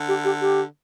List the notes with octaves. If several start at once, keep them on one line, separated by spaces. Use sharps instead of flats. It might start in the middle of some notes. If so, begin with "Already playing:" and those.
Already playing: D3
G4
G4
G4